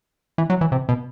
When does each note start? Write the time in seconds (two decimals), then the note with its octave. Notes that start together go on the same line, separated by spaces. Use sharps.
0.38 E3
0.50 F#3
0.61 E3
0.72 C3
0.89 B2